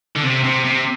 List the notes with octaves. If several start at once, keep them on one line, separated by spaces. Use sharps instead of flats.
D3
C3
C3
C3